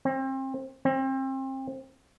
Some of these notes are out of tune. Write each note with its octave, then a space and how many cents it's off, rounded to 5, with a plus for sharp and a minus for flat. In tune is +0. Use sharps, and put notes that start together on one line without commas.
C4 +30
C4 +30